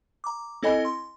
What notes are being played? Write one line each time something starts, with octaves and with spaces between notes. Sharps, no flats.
A#5 D6
C4 E4 A4 D#5 G#5 B5
C6